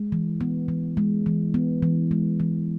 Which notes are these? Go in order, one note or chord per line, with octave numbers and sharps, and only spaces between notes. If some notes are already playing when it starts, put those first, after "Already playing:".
Already playing: G#3
E3
B3
E3
G#3
E3
B3
E3
G#3
E3